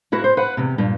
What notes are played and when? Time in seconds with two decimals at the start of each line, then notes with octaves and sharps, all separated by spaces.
0.12 A#3 E4 F#4 B4
0.24 C5
0.37 B4 F#5
0.57 E2 C3
0.78 G2 A#2